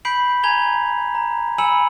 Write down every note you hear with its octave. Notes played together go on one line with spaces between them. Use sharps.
B5 G6 B6 C7 D7 F#7
G#5 A#5 G#6 F7 G7
A#5
G#5 B5 E6 C#7 E7 F#7